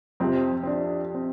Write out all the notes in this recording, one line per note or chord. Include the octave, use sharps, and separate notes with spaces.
F2 C3 F3 C4
C4
D4
C4